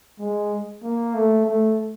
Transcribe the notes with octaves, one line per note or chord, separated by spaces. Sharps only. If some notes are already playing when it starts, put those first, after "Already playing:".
G#3
A#3
A3
A3